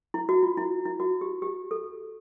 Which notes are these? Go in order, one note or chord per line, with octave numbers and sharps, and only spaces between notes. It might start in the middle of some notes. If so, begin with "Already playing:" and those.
E4
F#4
F4
E4
E4
F#4
G4
G4
A4